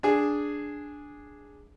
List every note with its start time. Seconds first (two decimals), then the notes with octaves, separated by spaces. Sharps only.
0.03 D4 G#4